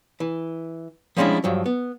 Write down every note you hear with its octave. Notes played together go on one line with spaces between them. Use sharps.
E3
F3 G3 G#3 C#4 D4 E4
G2 F3 F#3
B3